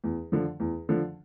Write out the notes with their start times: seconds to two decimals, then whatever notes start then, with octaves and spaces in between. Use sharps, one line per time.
0.04 E2
0.32 D3 F3
0.60 E2
0.89 D3 F3